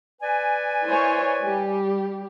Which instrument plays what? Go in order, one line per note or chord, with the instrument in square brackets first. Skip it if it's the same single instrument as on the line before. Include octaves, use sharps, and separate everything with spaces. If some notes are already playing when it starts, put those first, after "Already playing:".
[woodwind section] B4 D5 G#5
[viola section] E4 C5 C#5
G3 G4